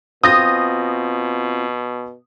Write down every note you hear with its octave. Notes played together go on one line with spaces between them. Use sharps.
B2 C4 F4 D#6 G6 A#6